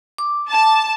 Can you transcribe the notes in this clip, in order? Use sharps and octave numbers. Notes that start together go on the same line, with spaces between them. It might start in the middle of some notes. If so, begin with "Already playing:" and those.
D6
A5